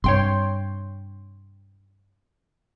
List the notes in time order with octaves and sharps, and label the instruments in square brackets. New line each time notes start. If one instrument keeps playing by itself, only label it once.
[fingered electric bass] G2 C3 [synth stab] C#5 G5 C6